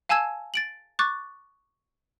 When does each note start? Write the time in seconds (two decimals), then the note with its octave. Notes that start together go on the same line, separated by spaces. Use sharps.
0.09 F5 G#5 A5 E6 G#6 E7
0.54 A6 D7 F#7
0.99 C#6 D6 F#6 A6